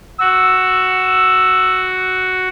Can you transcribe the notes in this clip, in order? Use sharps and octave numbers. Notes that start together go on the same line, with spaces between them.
F#4 E6